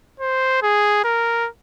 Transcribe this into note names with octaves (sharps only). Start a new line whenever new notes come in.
C5
G#4
A#4